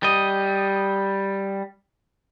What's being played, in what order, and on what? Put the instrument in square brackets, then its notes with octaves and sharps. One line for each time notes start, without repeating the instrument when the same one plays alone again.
[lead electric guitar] G3 D#5